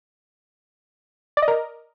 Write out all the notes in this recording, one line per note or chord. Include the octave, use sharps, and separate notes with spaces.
D5
D#5
A#4